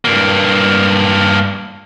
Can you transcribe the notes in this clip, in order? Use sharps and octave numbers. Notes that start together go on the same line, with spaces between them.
G2 A#3